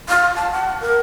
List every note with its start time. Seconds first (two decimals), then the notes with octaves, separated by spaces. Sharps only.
0.09 F5
0.36 A5
0.52 F#5
0.81 A#4